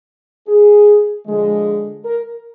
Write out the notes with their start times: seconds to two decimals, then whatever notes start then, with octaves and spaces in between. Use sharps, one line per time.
0.48 G#4
1.27 D3 F3 G#3
2.05 A#4